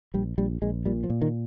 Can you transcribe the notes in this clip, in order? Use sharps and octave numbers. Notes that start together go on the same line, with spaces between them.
A#1 G3
A#1 G3
A#1 G#3
A#2 G3
F3
A#2
D#3